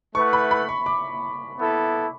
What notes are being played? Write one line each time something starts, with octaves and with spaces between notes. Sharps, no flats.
A3 E4 B4 F#5 C#6
B5
B5
C#6
D6
B3 E4 A4